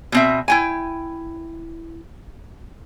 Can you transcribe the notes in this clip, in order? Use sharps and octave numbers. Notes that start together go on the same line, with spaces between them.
B2 C4 E5
E4 G5 G#5